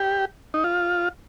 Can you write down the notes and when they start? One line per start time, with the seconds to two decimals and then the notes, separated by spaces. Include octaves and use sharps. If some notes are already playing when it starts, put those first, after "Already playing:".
Already playing: G4
0.54 D#4
0.64 F4